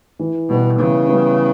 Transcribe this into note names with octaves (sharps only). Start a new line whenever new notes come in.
E3
B2 G3 B3
C#3 E3
G3 B3